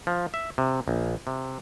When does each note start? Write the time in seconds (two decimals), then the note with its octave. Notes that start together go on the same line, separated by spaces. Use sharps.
0.07 F3
0.34 E5
0.58 C3
0.88 A#1
1.27 C3